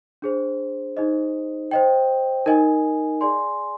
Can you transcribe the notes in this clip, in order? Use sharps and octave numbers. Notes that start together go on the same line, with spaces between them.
D4 G#4 C5
D#4 G#4 C5 D#5
C5 D#5 G5
D#4 A#4 D#5 G#5
G#4 D5 G#5 C6